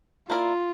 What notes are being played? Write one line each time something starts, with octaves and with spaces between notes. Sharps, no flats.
A#3 E4 F4 A#4 D5